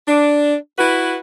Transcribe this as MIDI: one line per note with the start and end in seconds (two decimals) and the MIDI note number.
0.07 0.54 62
0.78 1.15 64
0.78 1.15 66
0.78 1.15 71